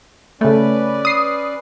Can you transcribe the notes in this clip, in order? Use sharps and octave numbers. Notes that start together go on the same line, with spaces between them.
C#3 A3 C#4 B4 D5
D#6 C7